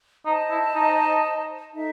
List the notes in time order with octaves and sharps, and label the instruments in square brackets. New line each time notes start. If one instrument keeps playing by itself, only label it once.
[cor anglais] D#4 [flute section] C5 D#5 A5
[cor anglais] E4
D#4
[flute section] D#4 A4 E5